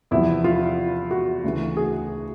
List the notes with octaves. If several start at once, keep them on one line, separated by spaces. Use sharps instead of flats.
E2 C3 F3 E4
F4
F#4
D2 C#3 E3
G#4